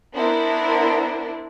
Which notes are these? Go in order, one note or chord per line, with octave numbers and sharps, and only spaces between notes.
B3 D4 E4 A#4 C5